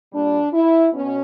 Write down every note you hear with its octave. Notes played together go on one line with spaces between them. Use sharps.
A#2 G3 D4
E4
B2 C#4